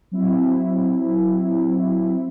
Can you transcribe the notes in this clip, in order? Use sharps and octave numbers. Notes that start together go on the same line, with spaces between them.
F#3 C4 E4